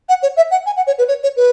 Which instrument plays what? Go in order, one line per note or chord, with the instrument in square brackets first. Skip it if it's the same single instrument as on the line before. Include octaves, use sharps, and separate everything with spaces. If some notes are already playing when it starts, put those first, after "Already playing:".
[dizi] F#5
C#5
E5
F#5
G#5
F#5
C#5
B4
C#5
C#5
B4